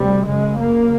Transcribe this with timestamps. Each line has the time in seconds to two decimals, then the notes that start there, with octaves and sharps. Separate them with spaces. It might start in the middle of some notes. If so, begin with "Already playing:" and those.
Already playing: D2 C3 G3
0.25 F#2 C#3 G#3
0.58 A#3